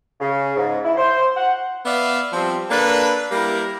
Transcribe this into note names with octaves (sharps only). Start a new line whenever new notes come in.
C#3
G#2
E4
C5
F#5
B3 D5 E5 F5
F3 G3 C4
A#3 D4 A4 B4
G3 A#3 E4 A#4